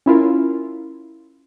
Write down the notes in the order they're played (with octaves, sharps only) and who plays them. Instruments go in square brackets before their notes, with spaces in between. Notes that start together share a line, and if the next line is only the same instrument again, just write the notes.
[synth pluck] C#4 E4 F4 A#4